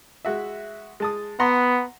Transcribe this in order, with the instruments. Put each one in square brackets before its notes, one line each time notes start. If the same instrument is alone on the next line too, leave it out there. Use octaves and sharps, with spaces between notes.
[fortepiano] G#3 F#4 E5
G#3 A5 D#6
[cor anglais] B3 [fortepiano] F#5 A#5 C6